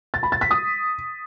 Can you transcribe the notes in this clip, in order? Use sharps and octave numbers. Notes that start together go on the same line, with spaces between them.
A6
B5
A6
B6
D#6